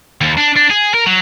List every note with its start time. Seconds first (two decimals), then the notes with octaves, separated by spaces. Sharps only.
0.21 D#2
0.37 D4
0.56 D4
0.70 G#4
0.94 A#4
1.06 F#3